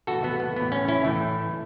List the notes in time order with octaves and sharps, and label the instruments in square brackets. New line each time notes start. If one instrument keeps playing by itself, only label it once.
[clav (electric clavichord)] A2 E3 B3 F#4 A4
B3
B3
A2 E3 B3
C#4
C#4 E4
A2 E3 A3